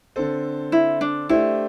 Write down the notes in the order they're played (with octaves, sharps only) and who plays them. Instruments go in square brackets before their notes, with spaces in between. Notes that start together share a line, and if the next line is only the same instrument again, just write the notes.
[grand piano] D3 C4 A4 C5
[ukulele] E4
D4
[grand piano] A3 D4 G4 C5 [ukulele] E4